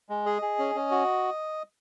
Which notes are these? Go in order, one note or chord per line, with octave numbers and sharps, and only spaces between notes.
G#3
G#4 D#5
G#4
C#4
C#4
F#4